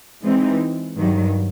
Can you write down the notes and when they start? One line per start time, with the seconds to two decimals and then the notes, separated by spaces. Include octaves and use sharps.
0.22 E3 G#3 C4 D#4
0.95 G2 D#3 F#3